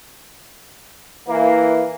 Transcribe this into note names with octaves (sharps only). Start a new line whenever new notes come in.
E3 A#3